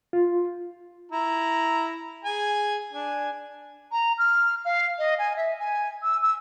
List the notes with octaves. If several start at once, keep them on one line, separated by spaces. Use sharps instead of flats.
F4
E4 A#5
G#4 G#5
D4 G#5
A#5
F6
F5
D#5
G#5
E5
G#5
E6
E6